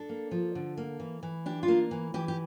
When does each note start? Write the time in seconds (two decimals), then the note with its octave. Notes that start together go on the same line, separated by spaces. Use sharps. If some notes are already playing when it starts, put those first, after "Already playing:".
Already playing: D4 A4
0.09 A#3
0.31 F3
0.55 D3
0.77 A#3
1.00 E3
1.23 E3
1.46 D4 G4
1.63 F4
1.68 A#3
1.91 E3
2.14 E3 G4
2.28 G4